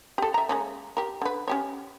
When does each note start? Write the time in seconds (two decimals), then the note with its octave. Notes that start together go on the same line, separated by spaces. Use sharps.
0.18 G4 A4
0.34 E5 A#5
0.49 G#3 A#3 C#4
0.97 G4 A#4
1.22 D3 B4
1.48 C#4 G4 C#5